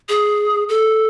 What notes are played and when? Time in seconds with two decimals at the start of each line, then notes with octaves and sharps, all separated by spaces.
0.09 G#4
0.69 A4